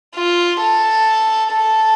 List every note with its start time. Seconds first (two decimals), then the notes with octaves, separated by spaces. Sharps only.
0.16 F4
0.61 A4
1.52 A4